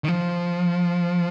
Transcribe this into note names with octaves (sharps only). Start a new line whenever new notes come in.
D#3
F3